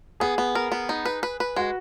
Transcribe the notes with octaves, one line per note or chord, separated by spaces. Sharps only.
B3 G#4
B3
A#4
B3
D#4
B4
B4
B4
G#3 F#4